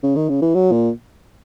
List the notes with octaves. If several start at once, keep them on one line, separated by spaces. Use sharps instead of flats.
C#3
D#3
C#3
E3
F#3
A#2